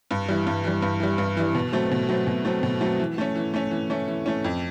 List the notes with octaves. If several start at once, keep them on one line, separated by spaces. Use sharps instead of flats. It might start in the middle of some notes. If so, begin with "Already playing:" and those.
G2
E3 G3
G2
E3 G3
G2
E3 G3
G2
E3 G3
B2
F#3 A3 C4
B2
F#3 A3 C4
B2
F#3 A3 C4
B2
F#3 A3 C4
E3
A3 C#4
E3
A3 C#4
E3
A3 C#4
E3
A3 C#4
F2